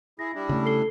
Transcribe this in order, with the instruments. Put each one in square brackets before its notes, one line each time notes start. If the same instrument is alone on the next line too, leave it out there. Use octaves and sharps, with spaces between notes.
[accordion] E4 G#4 [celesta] A#6
[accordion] G3 D4 E4
[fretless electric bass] C#3 A3
[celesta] A4 C7 G7